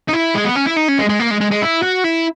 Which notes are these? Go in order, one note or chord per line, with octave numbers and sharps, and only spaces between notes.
D#4
E4
G#3
B3
C#4
E4
D#4
C#4
G#3
G#3
A#3
G#3
G#3
G#3
E4
F#4
E4